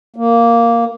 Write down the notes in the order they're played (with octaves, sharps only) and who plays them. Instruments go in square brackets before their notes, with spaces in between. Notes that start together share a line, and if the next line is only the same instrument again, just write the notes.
[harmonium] A#3